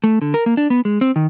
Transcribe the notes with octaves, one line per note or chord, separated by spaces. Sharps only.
A3
D3
A#4
A#3
D4
B3
G#3
C4
D#3